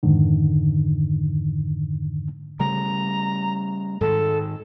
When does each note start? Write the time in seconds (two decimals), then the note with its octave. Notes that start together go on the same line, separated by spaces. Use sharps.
0.03 F2 G#2 D3 D#3
2.60 C#3 G3 A3 A#5
4.01 G#2 D#3 G#3 A4